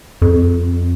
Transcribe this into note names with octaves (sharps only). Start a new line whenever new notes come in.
F2